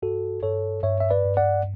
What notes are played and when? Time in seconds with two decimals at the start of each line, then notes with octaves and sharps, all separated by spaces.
0.02 G2 F#4 A4
0.43 G2 A4 C#5
0.83 G2 C#5 E5
1.00 E5
1.10 B4 D5
1.25 G2
1.37 D5 F#5